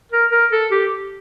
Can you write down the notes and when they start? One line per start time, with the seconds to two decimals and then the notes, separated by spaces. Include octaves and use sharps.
0.12 A#4
0.32 A#4
0.52 A4
0.71 G4